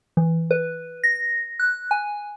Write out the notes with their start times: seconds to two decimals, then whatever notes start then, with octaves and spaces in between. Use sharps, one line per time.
0.17 E3
0.51 B4
1.04 A#6
1.59 F#6
1.91 G#5